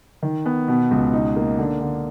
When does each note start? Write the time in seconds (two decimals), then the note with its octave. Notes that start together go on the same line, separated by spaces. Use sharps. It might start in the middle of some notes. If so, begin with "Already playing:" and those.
0.23 D#3
0.46 B3
0.68 B2
0.91 C#2
1.13 D#4
1.36 A#3
1.59 D3
1.81 D3